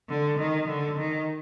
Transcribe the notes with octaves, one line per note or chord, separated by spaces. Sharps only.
D3
D#3
D3
D#3